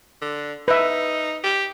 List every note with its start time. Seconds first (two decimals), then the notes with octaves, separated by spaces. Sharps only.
0.22 D3
0.68 D#4 B4 E5
1.44 G4